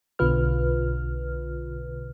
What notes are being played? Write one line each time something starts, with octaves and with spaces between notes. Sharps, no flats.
B1 B2 D3 F4 B4 F6